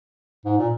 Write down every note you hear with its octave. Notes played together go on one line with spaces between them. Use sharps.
G#2
A#2